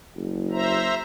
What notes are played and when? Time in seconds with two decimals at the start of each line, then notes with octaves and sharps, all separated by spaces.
0.16 F#1
0.52 C5 E5 A#5